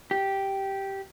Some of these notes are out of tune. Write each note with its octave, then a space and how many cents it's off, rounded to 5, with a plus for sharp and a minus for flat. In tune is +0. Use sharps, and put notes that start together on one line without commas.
G4 -5